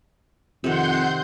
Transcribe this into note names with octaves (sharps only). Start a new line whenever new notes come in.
F2 C3 D#3 F#5 C6 G6